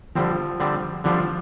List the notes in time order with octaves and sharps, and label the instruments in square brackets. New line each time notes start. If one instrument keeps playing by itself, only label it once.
[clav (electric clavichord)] D3 G3 C4 [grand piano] F3
[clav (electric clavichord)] D3 G3 C4
[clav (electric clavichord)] D3 G3 D4 F4 [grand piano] F3